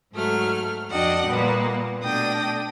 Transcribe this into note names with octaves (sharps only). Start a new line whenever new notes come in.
G#2 F#3 A3 F6
F2 D4 F#4 D#5 F#5 G5
A#2 G3 A#3 B3
B2 A3 D4 G5 D#6 A#6